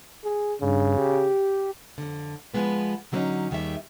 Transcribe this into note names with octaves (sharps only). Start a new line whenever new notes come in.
G#4
G2 C#3
G4
F2 D3
F3 F#3 G#3 B3 B4
D3 F#3 A3 C4 C#4 D#4
D#2 D#3 G3 G#4 E5